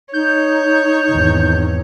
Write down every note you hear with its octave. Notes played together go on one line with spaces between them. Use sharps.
D#4 C#5 G6
G#1 E2